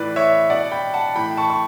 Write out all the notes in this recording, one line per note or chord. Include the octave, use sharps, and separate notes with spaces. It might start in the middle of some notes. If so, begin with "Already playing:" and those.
Already playing: A2 E3 B4 D5
C#5 E5
B2 D5 F#5
G5 B5
F#5 A5
A2 E3 G5 B5
A5 C#6
C#6